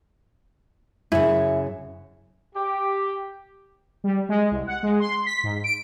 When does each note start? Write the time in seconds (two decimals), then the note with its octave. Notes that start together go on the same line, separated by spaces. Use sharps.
1.12 F#2 C#3 E4
2.55 G4
4.04 G3
4.29 G#3
4.51 C2
4.67 F#5
4.83 G#3
5.00 C6
5.26 B6
5.43 G#2
5.64 D7